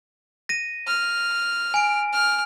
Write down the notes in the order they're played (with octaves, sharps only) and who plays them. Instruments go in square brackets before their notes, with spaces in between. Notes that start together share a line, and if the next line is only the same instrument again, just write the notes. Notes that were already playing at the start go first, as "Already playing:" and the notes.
[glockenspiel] A#6 D#7
[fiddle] F6
[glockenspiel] G#5 D7
[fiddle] F6